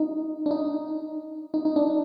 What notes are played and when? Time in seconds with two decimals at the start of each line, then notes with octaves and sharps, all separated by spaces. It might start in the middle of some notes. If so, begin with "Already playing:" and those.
Already playing: D#4
0.46 D4
0.51 D#4
1.54 D#4
1.65 D#4
1.76 D4